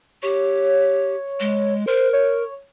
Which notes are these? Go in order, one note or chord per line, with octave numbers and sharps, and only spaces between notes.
G4 C#5
G#3
A#4 C5
C#5